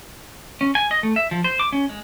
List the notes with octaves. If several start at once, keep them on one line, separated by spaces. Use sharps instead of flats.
C#4
G#5
D#5
A3
E5
F3
C5
D6
C#4
G#3